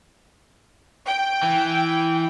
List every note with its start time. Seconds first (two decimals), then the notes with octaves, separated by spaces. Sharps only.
1.04 G5
1.43 E3